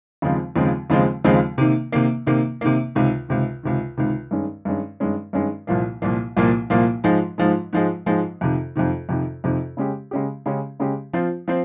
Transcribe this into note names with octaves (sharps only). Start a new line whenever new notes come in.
D#2 C#3 F3 G#3 C4
D#2 C#3 F3 G#3 C4
D#2 C#3 F3 G#3 C4
D#2 C#3 F3 G#3 C4
C3 D#3 A#3
C3 D#3 A#3
C3 D#3 A#3
C3 D#3 A#3
C#2 C3 D#3
C#2 C3 D#3
C#2 C3 D#3
C#2 C3 D#3
G2 D#3 G#3 C#4
G2 D#3 G#3 C#4
G2 D#3 G#3 C#4
G2 D#3 G#3 C#4
C2 A#2 F3 A#3
C2 A#2 F3 A#3
C2 A#2 F3 A#3
C2 A#2 F3 A#3
G#2 F3 G#3
G#2 F3 G#3
G#2 F3 G#3
G#2 F3 G#3
F2 C3 D#3
F2 C3 D#3
F2 C3 D#3
F2 C3 D#3
C#3 G#3 C#4 G4
C#3 G#3 C#4 G4
C#3 G#3 C#4 G4
C#3 G#3 C#4 G4
F3 C4 F4 C5
F3 C4 C5